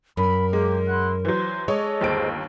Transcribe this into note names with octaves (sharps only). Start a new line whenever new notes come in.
F#2 A#4 B5
G#3 A#3 G4
E4 F#5 C6
E3 F#3 C5
G#3 D4 A4 C#5 D#5
G1 D#2 C5 D7